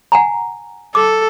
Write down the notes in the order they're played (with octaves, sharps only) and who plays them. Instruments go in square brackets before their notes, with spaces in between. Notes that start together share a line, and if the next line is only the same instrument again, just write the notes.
[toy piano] F#5 G#5 A#5
[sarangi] A4 [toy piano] D6